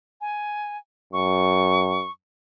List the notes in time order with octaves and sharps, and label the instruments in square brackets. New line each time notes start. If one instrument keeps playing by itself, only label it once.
[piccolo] G#5
[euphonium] F#2 [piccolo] C#6